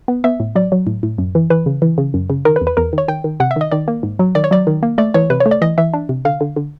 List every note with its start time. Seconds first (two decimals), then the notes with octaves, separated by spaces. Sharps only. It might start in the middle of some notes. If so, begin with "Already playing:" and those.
0.08 B3
0.24 B3 E5
0.40 A2
0.56 F#3 D5
0.72 F#3
0.87 A2
1.03 A2
1.18 F#2
1.35 E3
1.50 E3 B4
1.66 C#3
1.82 E3
1.98 C#3
2.14 F#2
2.30 C#3
2.45 D#3 A#4
2.56 B4
2.61 E2
2.67 B4
2.77 E2 A#4
2.93 D#3 C#5
3.08 D#3 G5
3.24 D#3
3.40 C3 F#5
3.51 E5
3.56 D#3 D#5
3.71 D#3 D5
3.88 A#3
4.03 G#2
4.19 F#3
4.35 D#3 D5
4.44 C#5
4.51 F#3 D5
4.67 D#3
4.83 A#3
4.98 A3 D5
5.14 E3 C#5
5.30 C3 B4
5.40 C#5
5.46 A3
5.51 D5
5.62 E3 D#5
5.78 E3 E5
5.94 D4
6.09 C3
6.25 D3 F5
6.41 D3
6.56 D3